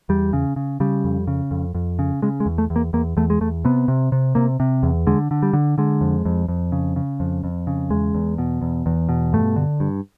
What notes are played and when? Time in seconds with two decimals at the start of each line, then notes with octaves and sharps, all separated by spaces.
0.09 E2 G3
0.33 C#3
0.56 C#3
0.80 C#3 G3
1.04 F2
1.27 C#3
1.51 F2
1.75 F2
1.99 C#3
2.22 C#3 G#3
2.40 G#3
2.46 E2
2.58 A3
2.70 E2
2.76 A#3
2.93 E2 A#3
3.17 E2 A3
3.30 G#3
3.41 E2 A3
3.65 C3 B3
3.88 C3
4.12 C3
4.35 C3 A#3
4.60 C3
4.83 E2
5.07 D3 G#3
5.31 D3
5.43 G3
5.53 D3
5.78 D3 G#3
6.01 F2
6.25 F2
6.48 F2
6.72 C#3
6.96 C#3
7.20 F2
7.44 F2
7.67 C#3
7.90 E2 G#3
8.14 E2
8.38 B2
8.62 E2
8.86 E2
9.09 B2
9.33 G2 A3
9.56 D3
9.80 G2